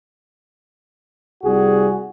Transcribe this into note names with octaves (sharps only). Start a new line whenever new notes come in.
C2 G3 F#4 G#4